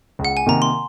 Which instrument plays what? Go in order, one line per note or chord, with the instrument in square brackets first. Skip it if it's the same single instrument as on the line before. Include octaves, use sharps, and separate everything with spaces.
[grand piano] C#2
[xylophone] F#5
G#5
[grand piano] C3 D#3 A#3 [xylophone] A#5
[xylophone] C6